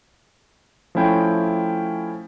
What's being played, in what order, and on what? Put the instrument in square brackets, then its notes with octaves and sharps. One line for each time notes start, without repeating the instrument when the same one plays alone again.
[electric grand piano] F3 A3 C#4 E4 G5 G6